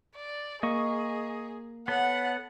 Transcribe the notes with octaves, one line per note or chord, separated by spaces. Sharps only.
D5
A#3 G#4 D#5 C#6
B3 A4 C#5 F#5